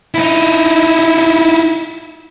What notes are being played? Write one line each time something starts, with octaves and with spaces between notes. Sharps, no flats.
D#4 E4